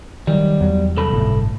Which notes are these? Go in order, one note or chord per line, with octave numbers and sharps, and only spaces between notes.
D#3 F#3 G3
E2 F#3
C2 A4 B5
G1 A2